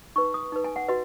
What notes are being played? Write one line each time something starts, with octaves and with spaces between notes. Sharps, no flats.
D#4 B4 C#6
D#6
D#4 B4
G#5
F#5
F#4 B4 D#5